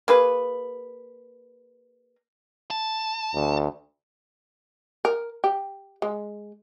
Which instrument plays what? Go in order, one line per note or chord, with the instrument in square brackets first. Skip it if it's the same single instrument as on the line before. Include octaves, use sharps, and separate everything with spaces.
[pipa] A#3 G#4 B4
[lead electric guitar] A5
[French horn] D2
[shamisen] A#4
G4
G#3